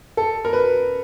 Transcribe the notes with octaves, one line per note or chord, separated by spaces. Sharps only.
A4
A#4
B4